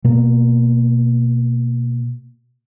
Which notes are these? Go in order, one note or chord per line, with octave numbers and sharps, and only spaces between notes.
B2 A#3